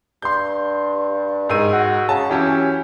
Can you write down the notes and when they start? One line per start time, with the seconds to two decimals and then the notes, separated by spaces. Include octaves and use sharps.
0.22 G2 C6 G6
1.49 G#2 D#3 E6 D#7
1.73 F#4
2.09 C#3 A5
2.30 E3 F#3 C#4 G4